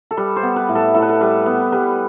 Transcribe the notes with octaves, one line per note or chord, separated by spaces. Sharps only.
A4
G3 B4
C5
B3
B4
A2
A4
A2 A4
B4
A4
G3 B4
B3
G3 B4